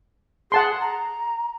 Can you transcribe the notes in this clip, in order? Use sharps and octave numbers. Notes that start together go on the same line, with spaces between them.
G#4 F#5 A5 C6
A#5